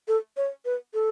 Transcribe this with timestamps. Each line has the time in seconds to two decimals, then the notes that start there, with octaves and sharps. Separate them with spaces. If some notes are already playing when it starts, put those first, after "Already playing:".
0.08 A4
0.37 C#5
0.65 B4
0.94 A4